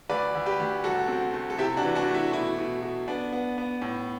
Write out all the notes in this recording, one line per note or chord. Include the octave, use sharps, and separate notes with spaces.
D2 B4 D5
D2
G4 B4
D2
C2 F#4 A4
C4
A3
A4
C3 E4 G4
D4 F#4
E3
D4 F#4
A3
E4
B2 E4
B2
B2
B3 D4
B3
B3
A2